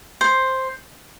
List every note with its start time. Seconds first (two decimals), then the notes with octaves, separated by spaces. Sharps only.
0.21 C5